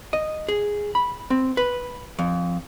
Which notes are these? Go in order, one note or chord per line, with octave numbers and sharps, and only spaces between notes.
D#5
G#4
B5
C4
B4
F2